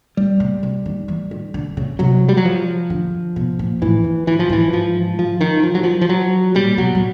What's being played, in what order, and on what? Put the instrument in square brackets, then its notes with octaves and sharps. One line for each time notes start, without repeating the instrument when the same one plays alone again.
[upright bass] D#3 [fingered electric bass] G3
[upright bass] C#3
C3
D#3
E3
D#3
D3
C#3
[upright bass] C3 [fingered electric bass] F#3
[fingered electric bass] G3
F#3
F3
[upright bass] D3
B2
A#2
[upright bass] A2 [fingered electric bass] E3
[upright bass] G#2
[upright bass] G#2 [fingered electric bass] E3
[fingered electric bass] F3
[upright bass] G#2 [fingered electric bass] E3
[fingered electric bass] F3
F3
D#3
F3
F#3
F3
F3
F#3
[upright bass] A#2 [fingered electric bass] G3
[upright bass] B2 [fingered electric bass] F#3
[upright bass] A2